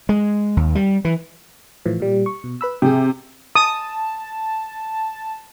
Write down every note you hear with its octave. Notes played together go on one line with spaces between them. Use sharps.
G#3
D#2
G3
E3
A2 E3 F3
A#2 G3
C#6
B2
B4 B5 E6
C3 G#4 G5
A5 D#6